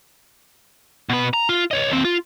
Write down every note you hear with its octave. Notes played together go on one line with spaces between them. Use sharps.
B2 B4
A#5
F4
C#5 D#5
D#2 C4
F4